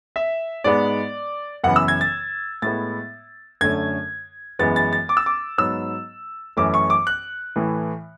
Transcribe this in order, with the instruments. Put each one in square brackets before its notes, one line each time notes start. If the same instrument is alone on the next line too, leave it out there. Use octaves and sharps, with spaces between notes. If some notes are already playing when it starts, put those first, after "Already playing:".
[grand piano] E5
G#2 G#3 B3 D5
F#2 C#3 E3 B3 F#5
E6
G#6
A6
A2 G#3 B3 A6
F#2 D3 A3 C#4 G#6
F#2 E3 G#3 B3 A6
A6
A6
D6
E6
D6
G#2 F#3 B3 E6
F#2 E3 A3 C#4 D6
C#6
D6
F#6
A2 E3 A3